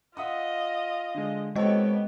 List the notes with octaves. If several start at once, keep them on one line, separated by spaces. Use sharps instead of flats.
F4 D#5 E5 F#5 D#6
D3 G#3
G#3 B3 C4 G4 A4 C#5 D#5